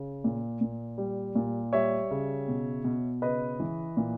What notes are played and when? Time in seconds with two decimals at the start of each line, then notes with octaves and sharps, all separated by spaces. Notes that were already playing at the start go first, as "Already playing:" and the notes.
Already playing: C#3
0.24 A#2
0.61 A#2
0.98 G3
1.35 A#2
1.73 G3 C#5 E5
2.11 C#3
2.48 B2
2.84 B2
3.22 C#3 B4 D#5
3.60 E3
3.97 A#2